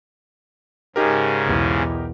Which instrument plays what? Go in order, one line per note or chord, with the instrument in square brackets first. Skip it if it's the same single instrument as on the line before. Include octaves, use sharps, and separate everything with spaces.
[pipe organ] G#2 C#3 [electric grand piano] D#4 G4 A#4
[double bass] B1 E2